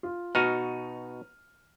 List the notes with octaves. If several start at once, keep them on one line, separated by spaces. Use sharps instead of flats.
F4
B2 D#4 F#4 F6 D#7